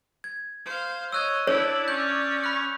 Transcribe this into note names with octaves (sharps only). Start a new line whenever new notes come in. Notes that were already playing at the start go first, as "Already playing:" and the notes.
G#6
C5 F5
C#5 D#5 E6 F#6 G#6
D4 E4 C#5 D5
C#4 G6
B5 F#6